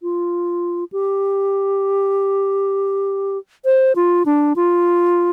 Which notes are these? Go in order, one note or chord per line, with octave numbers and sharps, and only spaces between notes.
F4
G4
C5
F4
D4
F4